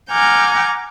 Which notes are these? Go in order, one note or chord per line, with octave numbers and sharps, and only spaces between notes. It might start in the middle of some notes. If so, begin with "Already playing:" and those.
F#5 G#5 A#5 D6 F6 G6